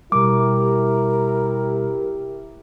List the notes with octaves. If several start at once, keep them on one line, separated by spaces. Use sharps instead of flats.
B2 G3 E4 G4 A#4 D6